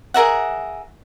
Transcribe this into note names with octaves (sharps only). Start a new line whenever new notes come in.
G#4 A#4 E5 F#5